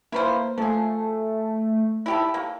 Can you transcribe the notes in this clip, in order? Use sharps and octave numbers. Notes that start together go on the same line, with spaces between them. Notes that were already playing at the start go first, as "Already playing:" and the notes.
A#3 E4 B4 C5
F3 A3 G#4
E4 G4 A4
A#3